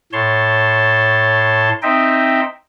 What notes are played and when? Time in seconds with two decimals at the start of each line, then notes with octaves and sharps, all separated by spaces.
0.13 A2 C#5 A5 C6
1.83 C4 D#4 C5 D#5 E5 G5